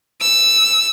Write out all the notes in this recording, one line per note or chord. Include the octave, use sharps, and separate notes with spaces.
E6